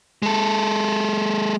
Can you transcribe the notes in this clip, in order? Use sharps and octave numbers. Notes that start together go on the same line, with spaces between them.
G#3 A4